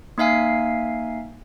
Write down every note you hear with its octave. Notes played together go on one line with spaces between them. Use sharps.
A#3 D#4 E5 F5 G#5 C7